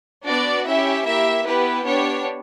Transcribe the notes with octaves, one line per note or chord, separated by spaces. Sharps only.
B3 D4 F#4 D5
C#4 E4 G4 E5
A#3 E4 G4 E5
B3 E4 G4 B4
B3 D4 G4 C#5